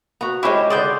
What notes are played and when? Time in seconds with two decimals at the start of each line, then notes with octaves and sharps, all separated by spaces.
0.21 B3 F#4 A#5
0.43 G#3 C#4 E4 G4 C5
0.70 D3 G#4 C5 D5 C6 G6